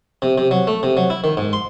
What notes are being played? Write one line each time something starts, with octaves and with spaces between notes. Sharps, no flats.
C3
C3
F#3
A3
C3
F#3
E4
D#3
G#2
C6